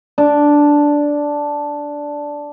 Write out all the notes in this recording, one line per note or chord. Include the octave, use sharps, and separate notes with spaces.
D4 D6